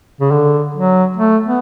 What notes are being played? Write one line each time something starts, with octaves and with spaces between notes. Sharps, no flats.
C#3
D3
F#3
A3
B3